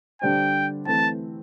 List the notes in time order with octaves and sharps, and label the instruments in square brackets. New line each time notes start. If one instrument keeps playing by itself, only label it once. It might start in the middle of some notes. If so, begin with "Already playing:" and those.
[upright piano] D3 G3 D4 G4 C5 [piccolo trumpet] G5
[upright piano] E3 A3 C4 [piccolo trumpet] A5